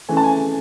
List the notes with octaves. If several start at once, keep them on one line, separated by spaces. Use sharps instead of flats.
C#3 E3 A3 G#5
A5
G#5